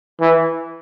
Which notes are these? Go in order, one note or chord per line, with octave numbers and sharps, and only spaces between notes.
E3